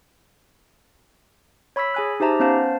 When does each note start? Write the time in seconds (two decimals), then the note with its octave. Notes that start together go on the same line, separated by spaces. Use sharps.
1.76 C#5 B5 C#6 E6 B6
1.94 G#4 G#5 F#6
2.20 D#4 G4 C5 E5 A5 A#5
2.40 B3 C#4 C5 F5 A5